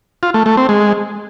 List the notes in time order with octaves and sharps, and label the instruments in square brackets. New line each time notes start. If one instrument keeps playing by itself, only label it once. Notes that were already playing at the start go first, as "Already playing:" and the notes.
[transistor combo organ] F4
A3
A3
C4
G#3